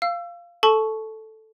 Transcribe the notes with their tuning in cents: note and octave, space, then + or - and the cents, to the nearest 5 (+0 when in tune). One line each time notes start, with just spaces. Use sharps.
F5 -10 E6 +30
A4 +0 A5 -25 C#6 +0